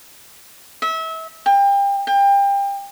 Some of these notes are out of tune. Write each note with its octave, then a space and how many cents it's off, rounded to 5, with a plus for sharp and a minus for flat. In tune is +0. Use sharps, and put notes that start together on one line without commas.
E5 -30
G5 +30
G5 +30